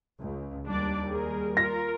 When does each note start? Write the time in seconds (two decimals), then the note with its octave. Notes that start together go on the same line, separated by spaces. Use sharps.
0.22 C#2
0.66 D#2 G3 D4 D5
1.09 G#4 A#4
1.57 F4 A#4 A#6